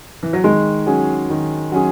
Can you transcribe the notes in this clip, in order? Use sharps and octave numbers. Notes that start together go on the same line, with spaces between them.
E3
F#3
D#3 G#3
F#3 C#4 G#4
D#3
F#3 C#4 G#4